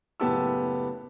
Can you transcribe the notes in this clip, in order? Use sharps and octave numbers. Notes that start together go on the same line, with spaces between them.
F#1 A2 B3 G4 A5 E6